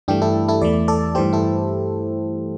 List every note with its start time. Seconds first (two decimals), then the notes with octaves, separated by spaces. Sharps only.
0.08 G2 E3 A3 D4 G4
0.22 E4 A4
0.48 E4 A4
0.61 E2 E3 A3 D5
0.88 A4 D5
1.15 G2 E3 A3 G4 C5
1.33 E4 A4